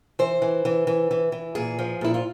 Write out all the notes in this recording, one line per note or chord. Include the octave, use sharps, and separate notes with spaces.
E3 C5
E3
E3
E3
E3
E3
A#2 G#4
F3
A#2 E4
F4